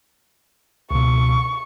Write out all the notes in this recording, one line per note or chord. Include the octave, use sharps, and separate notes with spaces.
C#2 B2 C#6